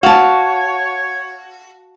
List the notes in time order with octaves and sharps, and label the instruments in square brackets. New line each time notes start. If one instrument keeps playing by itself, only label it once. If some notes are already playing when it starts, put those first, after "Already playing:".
[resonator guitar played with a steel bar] F#4 [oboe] C#5 [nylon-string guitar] F5 A5